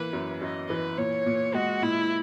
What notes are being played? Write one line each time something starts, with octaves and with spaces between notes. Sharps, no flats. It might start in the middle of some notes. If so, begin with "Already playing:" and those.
Already playing: E3 A#3 B4
F#2
F#2 D#5
E3 B4
A#2 C#5
A#2
G#3 F#4
A#2 E4